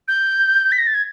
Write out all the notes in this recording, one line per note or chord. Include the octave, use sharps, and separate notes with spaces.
G6
B6
A#6
A6
G#6